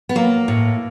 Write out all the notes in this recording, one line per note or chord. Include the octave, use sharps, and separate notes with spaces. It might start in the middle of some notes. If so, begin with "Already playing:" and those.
B3
F#3 A#3
A2